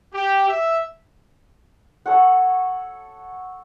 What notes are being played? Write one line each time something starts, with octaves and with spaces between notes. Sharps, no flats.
G4
E5
A4 C#5 F#5